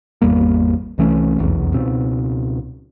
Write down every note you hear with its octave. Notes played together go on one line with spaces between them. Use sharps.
G#1 E2 G3 A#3
C2 E3 A3 C#4
F1 B1 E2
C#2 B2 C4